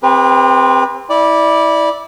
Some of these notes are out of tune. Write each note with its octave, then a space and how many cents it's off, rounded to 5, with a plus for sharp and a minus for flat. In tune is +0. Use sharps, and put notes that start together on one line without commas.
C4 +0 G4 +35 B4 -30
E4 -20 D5 +0